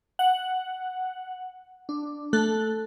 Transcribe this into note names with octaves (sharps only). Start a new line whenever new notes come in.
F#5
D4
A3 A4 F#6